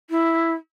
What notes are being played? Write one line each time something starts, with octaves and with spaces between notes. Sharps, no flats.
E4